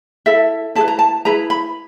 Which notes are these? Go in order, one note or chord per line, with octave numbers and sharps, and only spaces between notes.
E4 A4 E5
E4 G#4 A5
B4
A#5
A5
E4 G#4 B4 A#5
B5